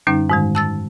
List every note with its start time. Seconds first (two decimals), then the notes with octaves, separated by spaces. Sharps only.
0.07 F#2 D3 G3 C#4 D#4
0.30 G#2 D#3 G#3
0.55 A5 E6 A6